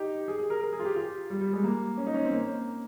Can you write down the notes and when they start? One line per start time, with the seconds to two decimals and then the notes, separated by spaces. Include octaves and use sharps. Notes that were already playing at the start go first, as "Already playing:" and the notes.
Already playing: D#4 G4
0.28 G#4
0.38 G#4
0.50 A#4
0.61 A#4
0.73 G#4
0.79 F4
0.85 G4
0.96 F4
1.30 G3
1.41 G3
1.53 G#3
1.63 A#3
1.97 C#4
2.07 D#4
2.14 C#4
2.25 C4
2.32 A#3